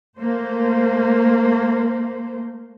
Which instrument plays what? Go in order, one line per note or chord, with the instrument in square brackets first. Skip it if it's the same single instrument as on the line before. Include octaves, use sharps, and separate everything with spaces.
[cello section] A3 A#3 C5